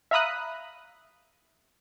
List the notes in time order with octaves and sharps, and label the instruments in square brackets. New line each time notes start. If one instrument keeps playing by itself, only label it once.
[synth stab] E5 F5 A#5 B5 D#6 F#6